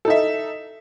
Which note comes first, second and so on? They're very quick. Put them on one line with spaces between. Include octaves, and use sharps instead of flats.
A4 D#4 E5